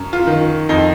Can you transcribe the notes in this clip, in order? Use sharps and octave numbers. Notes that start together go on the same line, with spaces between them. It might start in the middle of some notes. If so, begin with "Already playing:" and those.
Already playing: F#2
F4
D#3
F2 D#4